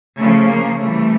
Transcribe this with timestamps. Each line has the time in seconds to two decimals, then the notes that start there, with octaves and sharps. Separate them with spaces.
0.18 C#3 F3 A3
0.49 A#3
0.80 C3 E3 G3 A3